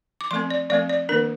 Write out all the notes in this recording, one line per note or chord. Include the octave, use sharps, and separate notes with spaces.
D6
F3 A3 C4 C6
D5
F3 A3 C4 D5
D5
D#3 A#3 D4 A#4